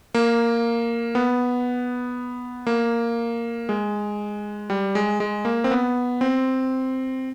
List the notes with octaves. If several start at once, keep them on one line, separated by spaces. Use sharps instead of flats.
A#3
B3
A#3
G#3
G3
G#3
G#3
A#3
C4
B3
C4